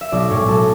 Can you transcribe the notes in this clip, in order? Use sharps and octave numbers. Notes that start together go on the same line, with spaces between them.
E5
B1 D5
A2 G#3 C#5
B1 A4